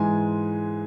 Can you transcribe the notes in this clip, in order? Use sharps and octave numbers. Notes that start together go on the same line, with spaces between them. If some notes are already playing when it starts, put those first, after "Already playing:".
Already playing: G#2 E3 G#3 G#5